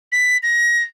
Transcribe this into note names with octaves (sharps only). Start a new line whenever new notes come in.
B6
A#6